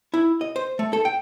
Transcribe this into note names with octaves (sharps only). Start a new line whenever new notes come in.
E4
D#5
C5
A3
A4
G5